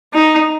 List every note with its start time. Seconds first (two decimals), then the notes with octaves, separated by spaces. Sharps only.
0.13 D#4